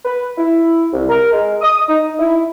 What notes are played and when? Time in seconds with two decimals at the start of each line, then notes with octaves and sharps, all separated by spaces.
0.05 B4
0.38 E4
0.93 C2
1.10 A#4
1.33 G#3
1.62 D#6
1.89 D#4
2.19 E4